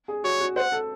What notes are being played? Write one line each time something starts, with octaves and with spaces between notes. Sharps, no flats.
G#4
F#4 C#5
F#4
C5 F#5
A4